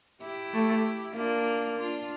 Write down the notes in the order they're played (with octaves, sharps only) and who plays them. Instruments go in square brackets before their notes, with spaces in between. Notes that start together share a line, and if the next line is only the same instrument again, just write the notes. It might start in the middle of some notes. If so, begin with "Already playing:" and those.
[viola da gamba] E4 G4
[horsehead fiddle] A3
[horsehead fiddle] A#3 [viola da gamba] D4 F4
[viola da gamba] D4 F4